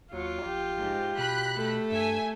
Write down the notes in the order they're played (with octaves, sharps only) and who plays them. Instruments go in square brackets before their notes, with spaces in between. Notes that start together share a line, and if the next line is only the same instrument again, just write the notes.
[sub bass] D#2 [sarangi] F#3 [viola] F4
[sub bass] A#1 [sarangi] G4
[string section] G#2
[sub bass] B2 [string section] B5 F#6
[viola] A3 A4
[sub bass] G2 [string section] E5 G#5